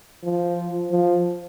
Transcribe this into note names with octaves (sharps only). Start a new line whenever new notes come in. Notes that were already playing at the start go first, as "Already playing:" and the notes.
F3
F3